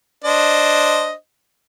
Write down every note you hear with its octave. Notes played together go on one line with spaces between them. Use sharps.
D4 C5 D#5